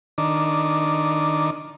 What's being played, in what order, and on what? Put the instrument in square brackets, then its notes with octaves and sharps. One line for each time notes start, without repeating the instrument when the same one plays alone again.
[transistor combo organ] D#3 D4